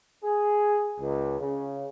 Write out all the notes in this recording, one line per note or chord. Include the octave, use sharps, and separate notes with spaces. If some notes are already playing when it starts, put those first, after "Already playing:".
G#4
C#2
C#3